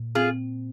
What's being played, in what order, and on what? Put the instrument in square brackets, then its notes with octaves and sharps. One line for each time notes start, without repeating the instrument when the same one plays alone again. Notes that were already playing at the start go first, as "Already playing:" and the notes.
Already playing: [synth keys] A#2
[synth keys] C4 [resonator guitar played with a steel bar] F4 G#4